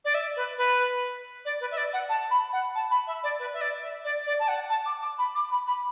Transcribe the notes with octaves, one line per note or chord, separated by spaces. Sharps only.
D5
E5
B4
B4
D5
B4
E5
D5
F#5
A5
B5
F#5
A5
B5
E5
D5
B4
E5
D5
E5
D5
D5
A5
F#5
A5
D6
D6
B5
D6
B5
B5